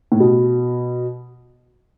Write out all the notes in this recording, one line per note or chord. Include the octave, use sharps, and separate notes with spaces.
A2
B2